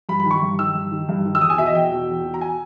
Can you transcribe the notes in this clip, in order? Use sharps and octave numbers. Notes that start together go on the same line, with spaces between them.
G2 B5
B5
D#3
C#6
G2
D#3 E6
G2
D#3
G2
D#3
E6
E2 D#6
G#5
B2 E5
D#5
E2 G5
B2
E2
B2
A#5
G#5